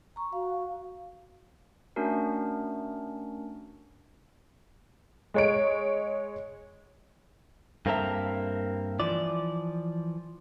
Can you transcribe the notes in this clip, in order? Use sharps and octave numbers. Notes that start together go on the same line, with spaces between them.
A#5 C#6
F#4 F5
A3 C#4 D4 F#4 A#4
G#3 C#5 D7
G2 A#3 C4 A4 A#4 E5
E3 F3 D5